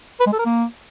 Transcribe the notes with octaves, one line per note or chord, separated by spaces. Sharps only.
B4
G#3
A4
A#4
A#3